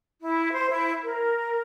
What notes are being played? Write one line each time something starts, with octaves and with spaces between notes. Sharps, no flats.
E4
C5
E4
A#4